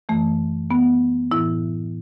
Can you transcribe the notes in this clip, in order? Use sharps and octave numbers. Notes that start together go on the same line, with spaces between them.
F#2 E3 A3
B3
A2 E3 E4